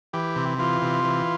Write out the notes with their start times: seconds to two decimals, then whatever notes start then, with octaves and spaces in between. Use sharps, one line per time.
0.13 E3 G4
0.36 C3
0.58 E3 F4
0.82 C3
1.04 E3